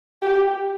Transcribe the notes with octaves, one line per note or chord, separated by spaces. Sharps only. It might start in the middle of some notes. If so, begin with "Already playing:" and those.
G4